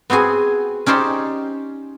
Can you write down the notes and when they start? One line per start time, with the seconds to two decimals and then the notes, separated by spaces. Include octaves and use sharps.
0.10 B3 C4 F#4 G#4 G#5
0.86 C#4 D#4 G4 C5 D5